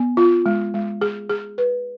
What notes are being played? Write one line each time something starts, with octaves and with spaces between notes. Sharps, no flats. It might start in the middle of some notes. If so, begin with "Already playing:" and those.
Already playing: B3
F4
G#3
G#3
G#4
G#4
B4